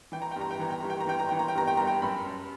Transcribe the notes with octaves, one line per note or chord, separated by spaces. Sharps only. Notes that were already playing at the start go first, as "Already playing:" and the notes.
E3 G5
A#5
G2 G5
A#5
G5
E3 A#5
G5
G2 A#5
G5
A#5
E3 G5
A#5
E3 G5
A#5
G5
G2 A#5
G5
G2 A#5
G5
F#2 B5
F#2